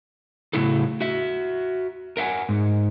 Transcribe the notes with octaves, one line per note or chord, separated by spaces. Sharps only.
A2 C#3 F#3 E4 F#4 A4
F#4 E5
A#4 E5 F#5 G#5
G#2